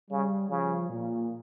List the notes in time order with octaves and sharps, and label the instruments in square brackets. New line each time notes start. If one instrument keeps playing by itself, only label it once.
[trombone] C#3 [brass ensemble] G3
[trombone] C#3 [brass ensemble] F3
[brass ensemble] A#2